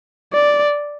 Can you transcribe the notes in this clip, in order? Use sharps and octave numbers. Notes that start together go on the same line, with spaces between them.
D5